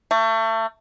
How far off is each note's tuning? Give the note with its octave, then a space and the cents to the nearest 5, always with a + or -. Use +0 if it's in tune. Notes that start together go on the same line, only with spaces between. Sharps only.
A3 +30